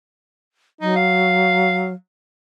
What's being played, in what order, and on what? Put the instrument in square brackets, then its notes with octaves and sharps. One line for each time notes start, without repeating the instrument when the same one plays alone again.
[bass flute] F#3 [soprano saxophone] D#4
[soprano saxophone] F5